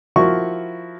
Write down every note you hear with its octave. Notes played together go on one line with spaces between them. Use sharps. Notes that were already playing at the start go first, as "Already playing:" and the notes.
F3 E4 F#4 A#4 C#6